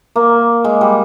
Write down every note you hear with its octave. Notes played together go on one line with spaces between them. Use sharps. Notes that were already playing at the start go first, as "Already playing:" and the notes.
A#3
G#3
G3